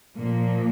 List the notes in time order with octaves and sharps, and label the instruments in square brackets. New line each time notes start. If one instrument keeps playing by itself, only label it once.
[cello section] A#2 F3 A#3